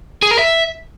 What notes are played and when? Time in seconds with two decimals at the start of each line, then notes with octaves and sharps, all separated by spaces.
0.22 G#4
0.31 A#4
0.39 E5